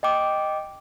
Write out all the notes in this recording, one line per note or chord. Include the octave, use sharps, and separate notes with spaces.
D#5 G5 D6